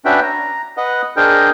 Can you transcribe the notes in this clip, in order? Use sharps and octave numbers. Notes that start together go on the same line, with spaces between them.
C#4 D4 F#4 B4 E5 G5
A#5
B4 D#5 F#5
D4 G#4 A#4 C5 D#5 G5